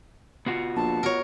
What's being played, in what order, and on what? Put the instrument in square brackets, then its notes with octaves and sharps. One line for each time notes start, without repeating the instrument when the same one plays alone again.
[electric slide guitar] B3 F4 F#4
[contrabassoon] A#1 [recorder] A5
[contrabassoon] B2 [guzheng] A#4 C#5